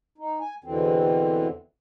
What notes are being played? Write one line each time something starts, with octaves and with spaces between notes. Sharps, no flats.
D#4
G#5
E2 B2 D3 E3 C4